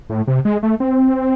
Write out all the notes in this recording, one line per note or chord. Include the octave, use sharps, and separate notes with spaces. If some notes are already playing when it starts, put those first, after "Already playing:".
A2
C3
G#3
A3
C4